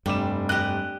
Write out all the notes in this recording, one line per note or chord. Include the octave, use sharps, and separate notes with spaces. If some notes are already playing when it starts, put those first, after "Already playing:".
F1 G2 G3 D6 E7
G4 D#5 F#6